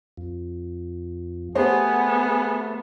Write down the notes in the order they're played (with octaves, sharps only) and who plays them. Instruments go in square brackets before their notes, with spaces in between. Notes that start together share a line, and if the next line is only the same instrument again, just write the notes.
[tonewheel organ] F2
[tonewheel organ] A3 [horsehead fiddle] B3 [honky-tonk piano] G4 C5 [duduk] G#4